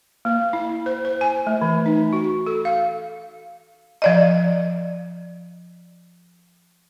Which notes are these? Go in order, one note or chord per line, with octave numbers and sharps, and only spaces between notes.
A#3
E4
C5
C5
G#5
A3
E3
D#4
F#4
A4
F5
F3 D5 D#5